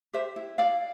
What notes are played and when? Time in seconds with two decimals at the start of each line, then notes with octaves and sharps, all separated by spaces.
0.13 G4 C5 E5
0.36 E4
0.58 E4 D5 F5